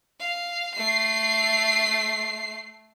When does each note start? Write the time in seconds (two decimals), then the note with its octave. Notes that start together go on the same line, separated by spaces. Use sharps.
0.20 F5
0.75 A3 C7